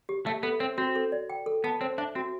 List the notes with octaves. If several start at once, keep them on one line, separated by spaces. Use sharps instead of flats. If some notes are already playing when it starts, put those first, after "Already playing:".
G4
A3 E5
B3 A4
C4 C5
C4 F#4
A4
D5
G5
A4
B3 A5
C4 C5
D4 E5
C4 F#4